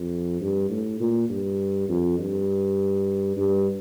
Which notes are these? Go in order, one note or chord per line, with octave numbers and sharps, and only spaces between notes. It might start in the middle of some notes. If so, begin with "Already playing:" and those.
Already playing: F2
G2
A2
A#2
G2
F2
G2
G2